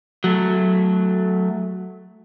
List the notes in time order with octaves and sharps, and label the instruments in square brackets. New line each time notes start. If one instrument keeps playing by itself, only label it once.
[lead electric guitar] F#3 A3